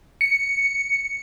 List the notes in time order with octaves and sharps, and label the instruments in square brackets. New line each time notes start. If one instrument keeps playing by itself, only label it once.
[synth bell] C#7